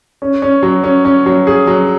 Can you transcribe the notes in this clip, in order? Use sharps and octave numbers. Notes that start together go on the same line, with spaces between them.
C#4
C#4
F#3
C#4
C#4
F#3
G#4
F#3